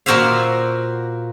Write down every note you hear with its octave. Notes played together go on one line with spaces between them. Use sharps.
A#2 A#3 F#4 C5 E5 F5